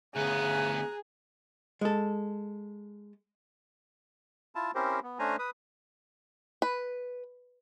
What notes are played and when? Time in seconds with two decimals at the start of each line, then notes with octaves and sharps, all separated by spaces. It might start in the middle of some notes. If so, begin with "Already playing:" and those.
0.16 D2 C#3 B3 G#4 A#5 F#6
1.81 G#3 A4
4.55 E4 F4 A5
4.75 C4 C#4 E4 G4 A#4 C5
5.03 B3
5.19 A3 C#4 D4 C5 G#5 A#5
5.39 B4 D#6
6.62 B4